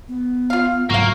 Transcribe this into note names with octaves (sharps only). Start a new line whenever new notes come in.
B3
F4 F5
C2 G#2 F#3 A#3 F#4 F5